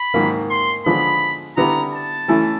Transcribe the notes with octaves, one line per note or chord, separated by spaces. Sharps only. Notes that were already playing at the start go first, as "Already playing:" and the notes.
Already playing: B5
G#2 D#3 F#3 A#3
C6
D3 F3 G#3 B3 B5
D3 G3 B3 E4 A#5
A5
E3 A3 C#4 E4